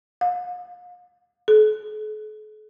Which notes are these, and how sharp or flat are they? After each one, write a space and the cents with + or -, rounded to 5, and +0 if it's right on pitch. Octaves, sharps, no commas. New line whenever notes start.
F5 +45
A4 -45